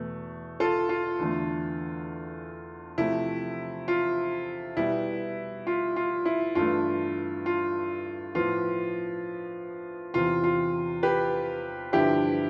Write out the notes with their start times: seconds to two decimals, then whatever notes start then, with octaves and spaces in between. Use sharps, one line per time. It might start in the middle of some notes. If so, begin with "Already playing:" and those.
Already playing: E2 B2 A3
0.60 F4 A4
0.89 F4
1.19 E2 D3 A3
2.98 C3 F3 A3 E4
3.88 F4
4.77 B2 G3 B3 E4
5.67 F4
5.96 F4
6.25 E4
6.55 G2 E3 A3 F4
7.46 F4
8.35 A2 F3 B3 F4
10.14 E2 C3 E3 F4
10.44 F4
11.03 G4 B4
11.93 G2 D3 F3 B3 E4 G4